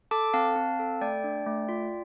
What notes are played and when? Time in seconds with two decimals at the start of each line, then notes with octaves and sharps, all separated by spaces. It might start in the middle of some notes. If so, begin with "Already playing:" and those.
0.11 A4 A5 D6
0.34 C4 F5 A5
0.56 C4
0.79 A4
1.01 A3 D5 G5
1.24 D4
1.46 A3
1.69 F4